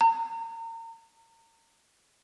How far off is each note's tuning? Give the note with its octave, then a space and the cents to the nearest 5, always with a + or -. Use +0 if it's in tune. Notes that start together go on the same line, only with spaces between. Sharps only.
A#5 -35